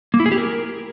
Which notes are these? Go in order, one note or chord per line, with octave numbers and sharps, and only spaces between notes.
A#3
E4
G#4
G4
A#4